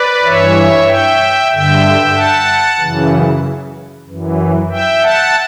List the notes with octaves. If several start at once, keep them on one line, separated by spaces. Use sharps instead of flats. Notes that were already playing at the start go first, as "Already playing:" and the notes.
Already playing: B4 D5
G2 E3 C#5 E5
E5 G5
G2 D3 E5 G5
F#5 A5
F#2 C#3 E3
F#2 E3
E5 G5
F#5 A5